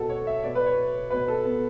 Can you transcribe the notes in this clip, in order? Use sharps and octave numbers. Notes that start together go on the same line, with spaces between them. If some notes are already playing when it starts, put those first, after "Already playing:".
Already playing: B2 F#4 A4
C#5
E5
B2 D5
B4
C#5
B2 B4
A4
B3